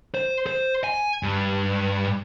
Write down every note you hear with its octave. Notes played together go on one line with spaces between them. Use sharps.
C5
C5
G#5
G2